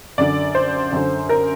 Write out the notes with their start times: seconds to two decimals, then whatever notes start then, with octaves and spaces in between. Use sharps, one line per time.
0.18 F#2 D3 D5
0.55 C5
0.92 F#2 D3
1.29 A#4